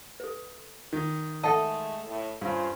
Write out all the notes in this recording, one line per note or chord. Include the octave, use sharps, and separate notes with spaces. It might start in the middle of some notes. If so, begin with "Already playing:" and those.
A4 B4
D#3
G#3 A3 A4 D#5 F#5 A5
A2
G2 C#4 F4 C5